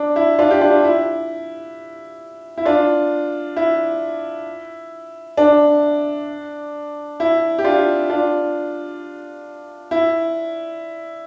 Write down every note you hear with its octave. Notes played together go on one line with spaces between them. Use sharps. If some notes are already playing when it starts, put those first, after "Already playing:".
Already playing: D4
E4
D4 F4
G4
D4 F4
E4
E4
D4 F4
E4
D4
E4
G4
D4 F4
D4 F4
E4